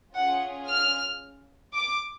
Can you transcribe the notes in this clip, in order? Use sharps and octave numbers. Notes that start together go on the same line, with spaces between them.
C#4 F4 G#4 F#5
F6
D6